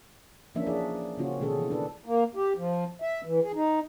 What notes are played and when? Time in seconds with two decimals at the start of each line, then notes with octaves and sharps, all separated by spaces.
0.55 E3 F3 A#3 C#4 D4 E5
0.67 D4 G#4 D5 E5
1.17 C#3 A#3 C4 C#4 F4 F#4
1.40 B2 D#3 G#3 C#4 G#4 A4
1.58 E3
1.70 D4 A4 B4
2.06 A#3
2.35 G4
2.57 F3
3.02 E5
3.25 E3
3.42 G#4
3.55 D#4